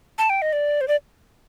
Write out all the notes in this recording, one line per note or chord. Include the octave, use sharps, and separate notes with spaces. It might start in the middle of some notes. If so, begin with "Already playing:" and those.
A5
G5
D#5
D5
C5
D5